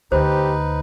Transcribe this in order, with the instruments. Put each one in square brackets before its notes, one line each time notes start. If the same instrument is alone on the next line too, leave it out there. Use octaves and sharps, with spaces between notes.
[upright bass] D2 [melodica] D#4 B4 [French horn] G4 [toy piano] C5